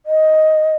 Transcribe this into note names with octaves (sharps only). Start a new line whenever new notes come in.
D#5